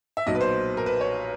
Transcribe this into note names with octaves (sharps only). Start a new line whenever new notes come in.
E5
B1 A#2 F#3 D#5
B4
C5
A#4
B4
C#5